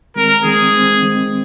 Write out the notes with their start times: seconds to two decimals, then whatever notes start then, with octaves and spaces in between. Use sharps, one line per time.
0.16 D#3 G#3 C4 A#4
0.44 D#3 G#3 C4 G#4
0.73 D#3 G#3 C4
1.02 D#3 G#3 C4